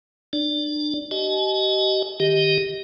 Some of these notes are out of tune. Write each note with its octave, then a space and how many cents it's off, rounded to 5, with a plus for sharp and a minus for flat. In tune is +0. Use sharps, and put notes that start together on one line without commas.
D4 +35 D5 -15
G4 -40 D#5 +0 G#5 +45
D#3 +0 G4 +0 D#5 +20